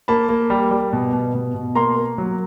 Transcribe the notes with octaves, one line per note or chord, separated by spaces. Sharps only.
A#3 A5 B5
A#3
G3
G3
B2
B2
B2
B2
A#3 A#5 C6
A#3
F#3